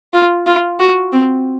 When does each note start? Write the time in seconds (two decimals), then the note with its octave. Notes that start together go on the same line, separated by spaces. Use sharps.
0.13 F4
0.46 F4
0.80 F#4
1.12 C4